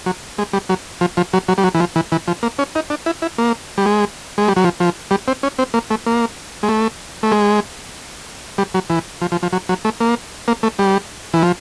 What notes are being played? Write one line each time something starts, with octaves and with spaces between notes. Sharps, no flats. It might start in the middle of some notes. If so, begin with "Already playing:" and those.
F#3
G#3
G3
F#3
F3
F3
F#3
F#3
G3
F#3
E3
F3
E3
E3
F3
A#3
C#4
D#4
D4
E4
E4
A#3
G3
G#3
G#3
G3
F#3
F3
F3
G3
C4
C#4
C4
A#3
A3
A#3
G#3
A3
A3
G#3
G3
F#3
E3
F3
F3
F3
F#3
F#3
A3
A#3
A#3
A3
G3
E3
F3